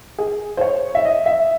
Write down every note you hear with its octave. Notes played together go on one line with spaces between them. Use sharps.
G#4
C5
C#5
E5
D#5
E5